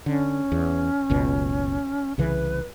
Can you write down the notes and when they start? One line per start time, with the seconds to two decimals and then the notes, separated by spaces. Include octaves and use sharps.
0.06 D3 C#4
0.52 E2
1.10 F#1 C#2 B2
2.18 C2 C#3 E3 B4